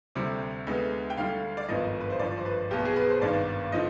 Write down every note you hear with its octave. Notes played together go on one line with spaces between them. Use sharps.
D2 C3 G3
D2 D3 G#3 B3
G5
D2 D3 G3 F5
D5
G#1 G2 F3 B3 D#5
B4
C5
G#1 G2 F3 D5
C5
B4
B1 B2 B3 G4
G#4
B4
C5
G#1 G2 D#3 B3 D5
D3 F3 C4 D#5